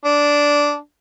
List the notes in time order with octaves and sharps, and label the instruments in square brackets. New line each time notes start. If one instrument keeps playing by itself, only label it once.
[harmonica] D4